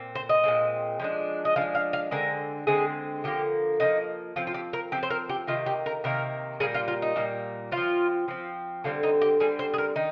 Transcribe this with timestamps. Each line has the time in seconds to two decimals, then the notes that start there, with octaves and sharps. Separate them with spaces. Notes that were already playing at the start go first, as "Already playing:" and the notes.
Already playing: A#2 C4
0.15 C5
0.29 D#5
0.44 A#2 G#3 C4
1.00 F3 G#3 D4
1.45 D#5
1.56 F3 G#3 D4 F5
1.75 F5
1.93 F5
2.11 D3 G#3 C4 A#4
2.67 D3 G#3 C4 G#4
3.24 D3 F3 A#3 G4
3.80 D3 F3 A#3 D#4
4.36 F3 C4 F4
4.47 F4
4.54 G4
4.73 A#4
4.92 F3 C4 G4
5.03 C5
5.10 A#4
5.29 G4
5.47 C3 D#3 A#3 F4
5.66 G4
5.86 A#4
6.04 C3 D#3 A#3 A#4
6.60 A#2 G3 A#3 G#4
6.74 F4
6.88 F4
7.02 D#4
7.16 A#2 G3 A#3
7.71 C4 F4
7.77 F3
8.28 F3 C4
8.84 D3 G3 C4 F4
9.03 D#4
9.22 G4
9.40 D3 G3 C4 G#4
9.59 C5
9.74 G#4
9.78 A#4
9.96 D#3 D#4